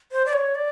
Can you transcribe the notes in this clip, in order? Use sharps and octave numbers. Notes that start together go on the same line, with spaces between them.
C5
D5
C#5
D5